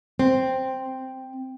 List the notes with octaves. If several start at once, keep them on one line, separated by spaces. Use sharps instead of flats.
C4